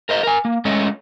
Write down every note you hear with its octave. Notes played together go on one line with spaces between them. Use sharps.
A#4 C5 D#5
A#4 G#5
A#3
G#3 A3 C#4 A4 C#5 D#5